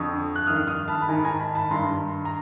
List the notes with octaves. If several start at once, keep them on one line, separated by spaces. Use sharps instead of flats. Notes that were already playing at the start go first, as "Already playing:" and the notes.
Already playing: F2 D3 C#6 D#6
F#6
G2 D#3 D#6 F6
D#6 F6
A5 B5
B5
G#2 D#3 G#5 A#5
G#5 A#5
A5 B5
A5 B5
G2 D#3 A#5 C6
A#5